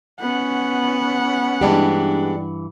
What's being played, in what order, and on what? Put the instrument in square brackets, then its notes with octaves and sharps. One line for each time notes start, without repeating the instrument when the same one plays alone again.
[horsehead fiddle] B3 C#4 [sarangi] F#5
[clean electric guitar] G2 E3 [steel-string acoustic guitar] G#3 D4 G4